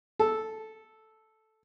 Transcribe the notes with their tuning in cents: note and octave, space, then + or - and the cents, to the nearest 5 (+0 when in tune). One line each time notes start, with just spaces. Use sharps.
A4 -5